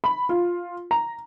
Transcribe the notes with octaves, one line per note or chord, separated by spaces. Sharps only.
B5
F4
A#5